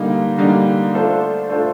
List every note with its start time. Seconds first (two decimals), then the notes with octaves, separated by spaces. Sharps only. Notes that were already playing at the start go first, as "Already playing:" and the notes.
Already playing: D3 G3 A#3 D#4
0.38 D3 G3 A#3 D#4
0.94 A3 D4 F4 A4 C5
1.49 A3 D4 F4 A4 C5